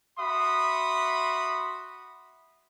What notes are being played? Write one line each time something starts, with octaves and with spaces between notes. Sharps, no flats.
F#4 E5 B5 C6 D#6